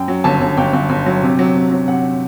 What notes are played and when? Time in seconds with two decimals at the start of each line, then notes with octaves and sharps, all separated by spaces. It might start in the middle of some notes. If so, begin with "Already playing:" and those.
Already playing: F#2 G5
0.08 F#3
0.24 G1 A5
0.41 G1
0.57 G1 G5
0.73 G1
0.90 G1
1.06 F#3
1.22 C3
1.39 F#3
1.55 C3
1.72 F#3
1.88 C3 F#5